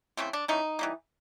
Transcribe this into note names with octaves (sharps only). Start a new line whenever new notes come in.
C#3 E3 A3 C4
D4
C#3 E3 A3 D#4
E3 G3 A#3